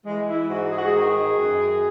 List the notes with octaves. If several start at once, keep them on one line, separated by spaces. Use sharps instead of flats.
E3 G#3
E4
G#2 F#4
G#4
F#4
G#4
D#3
F#2